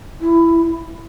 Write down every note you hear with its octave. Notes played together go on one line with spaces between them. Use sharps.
E4